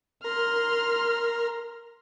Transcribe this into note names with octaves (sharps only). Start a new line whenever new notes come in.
A#4 C6 F6